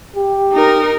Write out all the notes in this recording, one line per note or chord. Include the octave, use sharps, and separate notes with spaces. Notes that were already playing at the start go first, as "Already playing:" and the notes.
G4
D#4 A#4